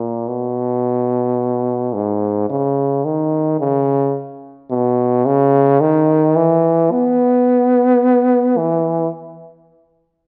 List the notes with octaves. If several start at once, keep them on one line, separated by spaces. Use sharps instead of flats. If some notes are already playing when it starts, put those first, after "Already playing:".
Already playing: A#2
B2
G#2
C#3
D#3
C#3
B2
C#3
D#3
E3
B3
E3